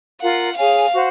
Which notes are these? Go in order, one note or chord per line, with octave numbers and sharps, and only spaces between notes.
F4 A#4 F5 F#5
G#4 C#5 F5 G#5
F#4 C5 F#5